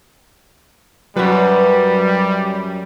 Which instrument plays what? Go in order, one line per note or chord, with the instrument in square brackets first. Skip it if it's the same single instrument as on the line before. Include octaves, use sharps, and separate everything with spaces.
[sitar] F#2 B4 [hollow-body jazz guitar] F#3 F#4 [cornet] G3